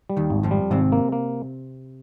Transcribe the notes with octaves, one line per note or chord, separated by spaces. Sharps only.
G3
D#2 D#3
G#1
F2 F3
G3
G#1 C3 C4
A#3
A#3